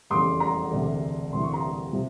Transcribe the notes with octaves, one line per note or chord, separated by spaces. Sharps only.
F1 E2 C#3 C6 D6
A#5 C6
E1 D2 C3
D2 C3 E3 C6
C#6
A#5 C6
C3 F3